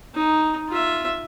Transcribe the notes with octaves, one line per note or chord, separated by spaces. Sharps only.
D#4
F4 E5